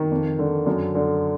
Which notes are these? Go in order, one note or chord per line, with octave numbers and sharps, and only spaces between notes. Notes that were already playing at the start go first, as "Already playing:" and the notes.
Already playing: D#3
F2
D3
F#2
D3